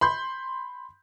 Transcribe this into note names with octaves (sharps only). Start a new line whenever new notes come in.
B5 C6 G6